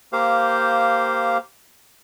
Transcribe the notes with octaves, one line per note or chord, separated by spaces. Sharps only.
A#3 G4 C5 F5